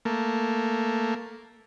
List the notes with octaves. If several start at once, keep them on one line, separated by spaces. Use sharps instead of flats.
A3 A#3